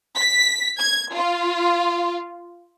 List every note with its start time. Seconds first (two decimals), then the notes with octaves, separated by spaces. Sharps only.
0.16 B6
0.79 G#6
1.14 F4